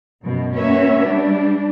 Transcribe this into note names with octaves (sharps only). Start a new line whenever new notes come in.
F#2 B2
A#3 C#4 F#4 B4 C#5 E5
G3 D4